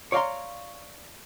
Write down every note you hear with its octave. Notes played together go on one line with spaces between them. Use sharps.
C#5 D5 F5 G5 A#5 C6